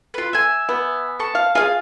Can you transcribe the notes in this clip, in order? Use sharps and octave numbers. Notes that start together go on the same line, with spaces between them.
F4 B4
E5 G#5
B3
A5 C#6
F5
F4 G#4 F5